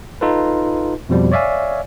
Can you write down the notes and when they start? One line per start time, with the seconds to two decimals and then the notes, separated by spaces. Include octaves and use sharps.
0.21 D#4 F4 A4 B4
1.09 F2 B2 F3 G3
1.32 C#5 D5 E5 F5 G#5